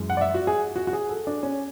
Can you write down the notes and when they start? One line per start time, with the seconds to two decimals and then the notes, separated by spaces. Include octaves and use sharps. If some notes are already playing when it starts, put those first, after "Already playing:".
Already playing: F#2 E3 G#3
0.10 F#5
0.17 D5
0.21 E5
0.34 F#4
0.47 G#4
0.76 F#4
0.87 F#4
0.93 G#4
1.09 A4
1.27 D4
1.43 C#4